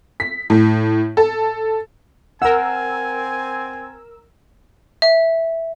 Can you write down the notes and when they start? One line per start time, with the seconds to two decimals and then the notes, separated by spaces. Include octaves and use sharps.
0.20 B6
0.50 A2
1.17 A4
2.42 C4 A#4 F#5 G#5 E6
5.02 E5